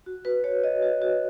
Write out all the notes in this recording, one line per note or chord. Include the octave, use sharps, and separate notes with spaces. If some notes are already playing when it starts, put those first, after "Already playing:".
F#4
F#4 B4
F#4 C#5
F#4 D#5
F#4
F#4